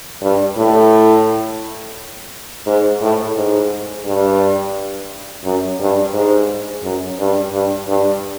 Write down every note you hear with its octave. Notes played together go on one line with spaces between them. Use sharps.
G2
A2
G#2
A2
G#2
G2
F#2
G2
G#2
F#2
G2
G2
G2